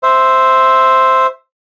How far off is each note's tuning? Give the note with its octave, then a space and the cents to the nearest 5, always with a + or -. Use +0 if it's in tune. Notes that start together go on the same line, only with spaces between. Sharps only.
C5 +0 E5 +0